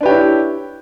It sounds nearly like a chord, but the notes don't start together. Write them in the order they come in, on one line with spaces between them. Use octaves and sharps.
D4 B4 G4 C#5 E4